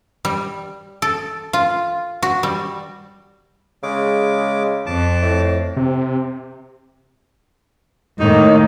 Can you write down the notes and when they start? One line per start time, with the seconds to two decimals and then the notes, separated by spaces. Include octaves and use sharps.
0.25 G3
1.02 A4
1.53 F4
2.22 F#4
2.43 G3
3.83 C#3 G#3 D6
4.87 F2 A5 D6
5.22 A2
5.77 C3
8.20 A2 D#3 A#3 D#4